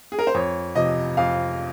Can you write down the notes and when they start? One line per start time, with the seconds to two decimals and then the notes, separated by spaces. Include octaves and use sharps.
0.12 G#4
0.19 A#4
0.27 C5
0.34 F2 C#5
0.75 C3 F3 D#5
1.17 F2 F5